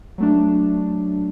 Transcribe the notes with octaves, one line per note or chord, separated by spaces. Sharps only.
F#3 A3 D4